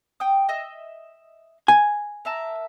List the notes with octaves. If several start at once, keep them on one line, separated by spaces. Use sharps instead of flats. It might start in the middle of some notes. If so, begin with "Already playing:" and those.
G5 D#6
D#5 E5 D#6
G#5
A#4 E5 A5